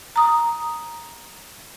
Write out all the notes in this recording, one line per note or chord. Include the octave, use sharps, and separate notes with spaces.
A#5 D#6